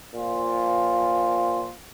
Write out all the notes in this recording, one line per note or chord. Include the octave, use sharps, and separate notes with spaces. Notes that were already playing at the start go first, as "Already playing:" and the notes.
A#2 F3 F4